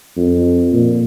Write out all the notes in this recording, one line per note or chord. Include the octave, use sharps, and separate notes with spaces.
F2
A#2